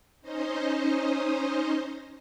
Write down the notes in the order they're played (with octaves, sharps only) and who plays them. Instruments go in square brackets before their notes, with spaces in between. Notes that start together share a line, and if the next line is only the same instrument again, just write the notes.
[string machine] C#4 D#4 C5 D#5